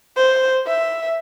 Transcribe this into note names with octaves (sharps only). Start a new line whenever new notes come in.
C5
E5